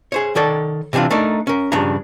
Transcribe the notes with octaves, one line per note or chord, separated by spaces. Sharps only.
G#4 C5 C#5
D#3 A4 C#5 D5
C3 E3 C4 D4 F4
A3 D4 D#4 A#4 D5
C#4 A#4
G2 C#3 F3 D4 A#5